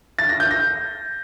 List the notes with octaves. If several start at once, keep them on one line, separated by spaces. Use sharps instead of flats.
A6
A#6
G6
A#6